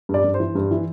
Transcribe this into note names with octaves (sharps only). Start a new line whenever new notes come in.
G2
D5
G2
C5
E3
G2
E3